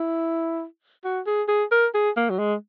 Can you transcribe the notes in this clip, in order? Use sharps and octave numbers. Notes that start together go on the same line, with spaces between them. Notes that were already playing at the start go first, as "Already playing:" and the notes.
Already playing: E4
F#4
G#4
G#4
A#4
G#4
A#3
F#3
G#3